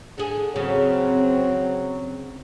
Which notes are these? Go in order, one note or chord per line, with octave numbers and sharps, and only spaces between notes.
D3 G#4
C#3 F#3 C4